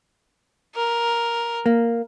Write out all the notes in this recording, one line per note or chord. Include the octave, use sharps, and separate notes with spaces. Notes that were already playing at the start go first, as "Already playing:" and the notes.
A#4
A#3